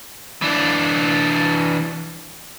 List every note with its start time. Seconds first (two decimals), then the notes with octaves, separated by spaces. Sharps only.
0.42 E3 D4